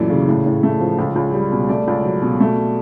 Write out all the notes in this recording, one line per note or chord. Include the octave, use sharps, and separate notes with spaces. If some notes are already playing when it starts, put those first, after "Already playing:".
Already playing: F#2 A#2 E3 A3 D5
C#3
A2
A2
A3
F3
C#2
C#2
G3
B2
A3 D5
C#2
F#3
B2
A3